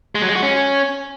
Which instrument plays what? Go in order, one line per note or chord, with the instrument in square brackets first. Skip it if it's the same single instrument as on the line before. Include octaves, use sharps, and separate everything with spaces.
[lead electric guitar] G#3
F#3
G#3
F#4
C#4